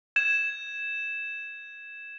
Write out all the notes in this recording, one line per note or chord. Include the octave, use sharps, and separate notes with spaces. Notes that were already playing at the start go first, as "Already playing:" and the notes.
G#6 E7